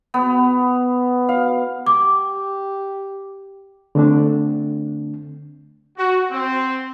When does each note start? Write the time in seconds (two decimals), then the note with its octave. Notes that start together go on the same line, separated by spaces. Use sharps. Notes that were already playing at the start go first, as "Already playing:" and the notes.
0.14 B3
1.29 F5
1.87 G4 D6
3.95 D3 A3 C4 D4
5.97 F#4
6.31 C4